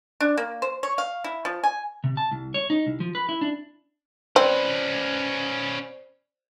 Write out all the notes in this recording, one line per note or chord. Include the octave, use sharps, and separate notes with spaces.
D4
A#3
C5
C#5
F5
E4
F3
G#5
C3
A5
C2
C#5
D#4
C2
F3
B4
E4
D4
C4 C#4 B4 C5 D5